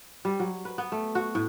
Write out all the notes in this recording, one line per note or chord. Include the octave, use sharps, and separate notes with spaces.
G3
F#3
B4
B3
A3
F#4
A2